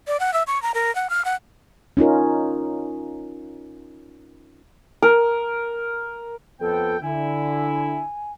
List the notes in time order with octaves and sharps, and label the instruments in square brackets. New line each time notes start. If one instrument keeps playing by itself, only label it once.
[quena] D5
F#5
E5
C#6
A#5
A#4
F#5
F6
F#5
[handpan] C#4 D#4 F4 A#4
[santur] A#4
[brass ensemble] F2 B3 G5 [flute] A4
[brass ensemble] D3 E4 [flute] G#5